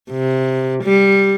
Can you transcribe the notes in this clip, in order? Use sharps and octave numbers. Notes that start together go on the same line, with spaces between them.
C3
G3